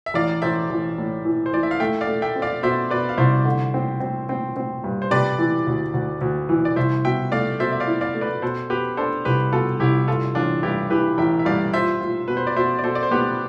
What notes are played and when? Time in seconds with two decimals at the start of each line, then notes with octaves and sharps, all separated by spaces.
0.06 E5
0.14 A1 D5 F5
0.42 A1 C5 E5
0.70 A1
0.98 A2
1.25 E3
1.46 C5
1.53 E3 D5
1.63 E5
1.71 F5
1.80 A3 E5 G5
2.01 D5 F5
2.07 A3
2.22 E5 G5
2.36 C4
2.42 D5 F5
2.63 B2 C5 E5
2.90 B2 B4 D5
3.09 F5
3.18 C2 C5 E5
3.45 D3
3.74 C4
4.00 C4
4.29 C4
4.56 C4
4.84 G2
5.02 C5
5.11 C3 B4 D5
5.39 E3
5.67 D2
5.94 D2
6.21 D2
6.49 E3
6.65 D5
6.76 C2 C5 E5
7.05 B2 E5 G5
7.32 A3 D5 F5
7.59 B2 C5 E5
7.72 E5
7.80 D5 F5
7.87 E4
8.01 D5 F5
8.14 A3
8.21 B4 D5
8.42 B2 A4 C5
8.70 B2 G4 B4
8.97 D4 A4 C5
9.25 C2 G4 B4
9.52 B2 F4 A4
9.80 C2 E4 G4
10.07 G2 F4 A4
10.35 A1 D4 F4
10.63 G2 E4 G4
10.90 E3 G4 B4
11.18 A1 E5 G5
11.39 E5
11.45 G2 D5 F5
11.73 F4 C5 E5
12.01 F4
12.28 B2 B4
12.37 C5
12.47 D5
12.56 B2 C5 E5
12.79 D5
12.84 B2 A4 C5
12.95 D5
13.03 C5
13.11 B3 G4 B4